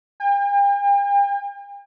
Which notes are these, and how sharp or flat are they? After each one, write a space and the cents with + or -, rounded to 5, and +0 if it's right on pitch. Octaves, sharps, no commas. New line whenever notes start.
G5 +45